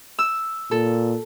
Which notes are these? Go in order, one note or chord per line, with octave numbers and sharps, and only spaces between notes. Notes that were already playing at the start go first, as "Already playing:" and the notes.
E6
A#2 A4